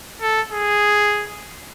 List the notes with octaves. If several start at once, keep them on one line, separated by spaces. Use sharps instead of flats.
A4
G#4